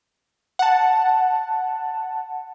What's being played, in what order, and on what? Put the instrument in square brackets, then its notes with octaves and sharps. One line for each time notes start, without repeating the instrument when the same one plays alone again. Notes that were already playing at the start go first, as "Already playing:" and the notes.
[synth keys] F#5 A5